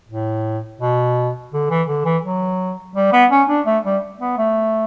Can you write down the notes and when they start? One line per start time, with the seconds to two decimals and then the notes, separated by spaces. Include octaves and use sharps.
0.09 A2
0.80 B2
1.53 D3
1.70 E3
1.88 D3
2.05 E3
2.24 F#3
2.96 G3
3.13 B3
3.31 C#4
3.49 D4
3.66 A3
3.85 G3
4.21 B3
4.38 A3